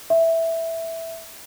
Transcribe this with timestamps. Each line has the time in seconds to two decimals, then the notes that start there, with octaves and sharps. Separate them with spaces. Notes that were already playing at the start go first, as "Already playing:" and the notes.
0.10 E5